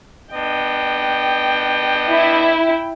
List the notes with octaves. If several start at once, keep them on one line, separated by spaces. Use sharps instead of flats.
B3 D4 D#5 G5
E4